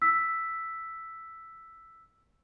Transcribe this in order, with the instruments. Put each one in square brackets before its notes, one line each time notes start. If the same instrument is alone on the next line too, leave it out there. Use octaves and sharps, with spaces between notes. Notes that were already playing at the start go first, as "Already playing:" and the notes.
[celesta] E6 B6